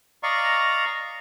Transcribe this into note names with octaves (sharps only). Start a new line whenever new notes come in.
D5 D#5 F5 A#5 C#6